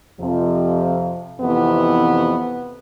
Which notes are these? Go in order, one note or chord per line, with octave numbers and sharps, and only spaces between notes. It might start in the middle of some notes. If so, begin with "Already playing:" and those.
F2 C3 F3
F2 C3 E3 B3